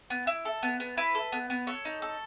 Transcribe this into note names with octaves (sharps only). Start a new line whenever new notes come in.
B3
E4
A4
B3
B3
E4 B4
A4
B3
B3
A4 C#5
D#4
A4